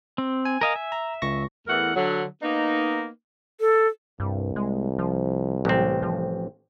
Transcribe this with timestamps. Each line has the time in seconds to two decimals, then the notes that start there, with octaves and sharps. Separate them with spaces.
0.18 C4
0.45 G#5
0.61 A#4 D#5 F5
0.76 E5
0.92 A#5
1.22 C#2 C#6 A#6
1.68 E2 E3 A3 A#4 F#5
1.95 D3 F#3
2.42 A#3 B3 D#4
3.60 A4
4.20 C2 G2
4.56 G#3
4.99 F3
5.65 A1 F#3 C4
6.02 F3